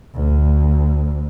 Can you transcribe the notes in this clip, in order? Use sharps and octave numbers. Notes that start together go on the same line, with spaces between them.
D2